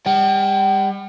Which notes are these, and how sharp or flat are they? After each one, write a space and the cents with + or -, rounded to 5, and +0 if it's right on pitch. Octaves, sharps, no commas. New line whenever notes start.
G3 +40 G5 -40